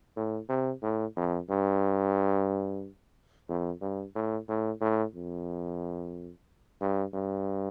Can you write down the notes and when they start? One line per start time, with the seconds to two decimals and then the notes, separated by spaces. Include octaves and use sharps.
0.16 A2
0.49 C3
0.82 A2
1.17 F2
1.50 G2
3.49 F2
3.81 G2
4.15 A2
4.49 A2
4.81 A2
5.15 F2
6.81 G2
7.14 G2